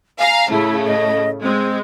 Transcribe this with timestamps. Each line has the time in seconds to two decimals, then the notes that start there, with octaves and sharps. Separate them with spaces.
0.19 F5 G#5 A#5
0.50 A2 C#3 A3 E4
0.87 D#5
1.43 G#3 C4